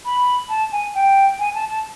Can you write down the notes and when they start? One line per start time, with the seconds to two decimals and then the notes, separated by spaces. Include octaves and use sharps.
0.05 B5
0.49 A5
0.72 G#5
0.95 G5
1.39 G#5
1.54 A5
1.69 A5